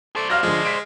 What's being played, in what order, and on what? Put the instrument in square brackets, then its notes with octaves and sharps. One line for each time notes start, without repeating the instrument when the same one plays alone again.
[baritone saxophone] A3 [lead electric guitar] C5 D5
[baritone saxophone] F#3 [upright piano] F5 F6 A#6
[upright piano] D3 F3 [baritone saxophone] G#3
[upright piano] B6 D7